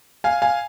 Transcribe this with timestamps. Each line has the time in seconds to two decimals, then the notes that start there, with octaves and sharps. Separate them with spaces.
0.24 F5 G#5
0.42 F5 G#5